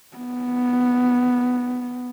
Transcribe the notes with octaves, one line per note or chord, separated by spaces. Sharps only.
B3